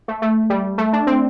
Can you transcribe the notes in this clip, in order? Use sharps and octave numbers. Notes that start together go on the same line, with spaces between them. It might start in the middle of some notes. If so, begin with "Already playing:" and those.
A3
A3
G3
A3
D4
C4